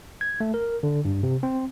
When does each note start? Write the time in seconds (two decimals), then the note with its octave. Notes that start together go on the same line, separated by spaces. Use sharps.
0.21 G#6
0.40 A3
0.54 A#4
0.83 D3
1.05 G2
1.23 C3
1.43 C4